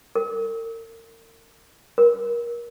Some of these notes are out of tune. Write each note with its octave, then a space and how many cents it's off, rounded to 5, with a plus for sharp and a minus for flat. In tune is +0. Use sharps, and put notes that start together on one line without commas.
A#4 -40
A#4 +25